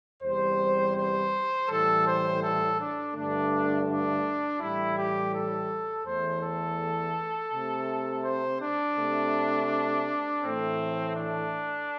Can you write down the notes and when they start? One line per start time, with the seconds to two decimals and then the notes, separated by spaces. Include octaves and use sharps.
0.23 E2 C3 G3 C5
0.96 C5
1.68 A2 E3 G3 A4
2.05 C5
2.41 A4
2.78 D4
3.15 G2 D3 A3 D4
3.87 D4
4.60 A2 E3 G3 E4
4.97 G4
5.33 A4
6.06 E2 E3 A3 C5
6.42 A4
7.52 C3 A3
8.24 C5
8.61 D4
8.97 C3 A3
10.43 A2 E3 A3 C4
11.16 D4